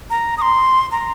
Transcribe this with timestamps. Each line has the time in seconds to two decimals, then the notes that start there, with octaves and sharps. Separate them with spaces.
0.10 A#5
0.38 D#6
0.42 C6
0.92 A#5